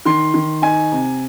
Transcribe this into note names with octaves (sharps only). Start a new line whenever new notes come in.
D#3 C6
D#3
D#4 G#5
C3